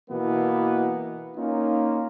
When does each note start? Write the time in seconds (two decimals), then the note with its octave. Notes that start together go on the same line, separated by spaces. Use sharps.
0.11 B2 E3 A#3 B3
1.36 A#3 C#4 D#4 F4